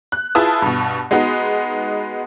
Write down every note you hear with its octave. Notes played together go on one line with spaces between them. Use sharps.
F#6
E4 F4 G#4 B4 A5 D#6
G2 B2
G#3 B3 D#4 F#4